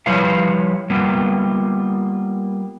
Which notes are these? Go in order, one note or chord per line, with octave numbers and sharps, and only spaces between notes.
F3 G3 E4 B4 C#5 F5
G3 A#3 B3 F4